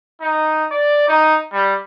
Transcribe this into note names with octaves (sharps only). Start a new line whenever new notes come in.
D#4
D5
D#4
G3